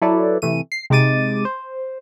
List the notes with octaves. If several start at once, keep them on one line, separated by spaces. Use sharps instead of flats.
F#3 E4 A4 B4 D5
C3 E3 A3 D#7
C7
C3 G#3 D#4 D6 A6 D#7
C5